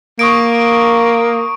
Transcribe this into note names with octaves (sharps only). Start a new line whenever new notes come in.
A#3 C#6 D#6 D7